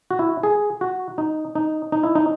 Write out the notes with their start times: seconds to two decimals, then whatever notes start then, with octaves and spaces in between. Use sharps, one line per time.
0.11 F#4
0.19 E4
0.43 G#4
0.81 F#4
1.18 D#4
1.55 D#4
1.92 D#4
2.03 E4
2.15 D#4